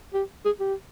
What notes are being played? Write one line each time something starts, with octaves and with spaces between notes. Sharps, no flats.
G4
G#4
G4